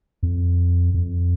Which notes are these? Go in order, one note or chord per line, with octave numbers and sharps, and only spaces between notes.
F2
F2